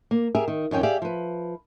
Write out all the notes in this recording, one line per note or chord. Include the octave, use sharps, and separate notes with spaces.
A#3
G4 G#4 A#4 E5
D#3
F2 D#3 C#4 G5
G4 G#4 D5 E5 F5
F3 B4